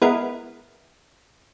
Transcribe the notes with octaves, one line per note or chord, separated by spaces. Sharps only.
G#3 B3 E4 A#4